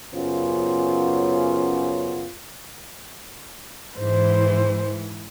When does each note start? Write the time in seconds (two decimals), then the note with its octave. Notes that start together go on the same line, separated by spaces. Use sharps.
0.14 F#2 C#3 B3 C#4 F4 C5
3.98 G#2 E3 C5